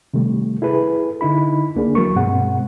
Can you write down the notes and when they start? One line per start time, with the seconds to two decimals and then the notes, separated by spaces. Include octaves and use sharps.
0.14 C3 D#3 G3 A3
0.62 E4 G#4 A4 B4
1.21 D3 D#4 E4 B5
1.76 C#2 A#3 D4 G#4
1.95 E3 F#3 G#3 A#4 C#6
2.16 G2 B2 G#3 C4 F#5